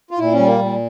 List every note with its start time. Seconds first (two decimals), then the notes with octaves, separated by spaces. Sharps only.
0.11 F4
0.19 A#2 E4
0.33 C#4
0.39 G3
0.46 A#3
0.60 A#2